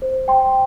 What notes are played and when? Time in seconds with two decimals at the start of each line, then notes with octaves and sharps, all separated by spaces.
0.02 C5
0.28 G5 C6